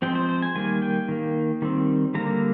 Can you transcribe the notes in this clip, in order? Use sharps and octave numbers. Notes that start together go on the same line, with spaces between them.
F3 G#3 C4 G5
C5
C5
G#5
D#3 G3 A#3 G#5
G5
D#3 A#3
D#3 G3 C4
D3 G3 A#3 A#5